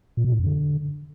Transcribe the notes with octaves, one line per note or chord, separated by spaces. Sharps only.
A#2
B2
A2
F2
D3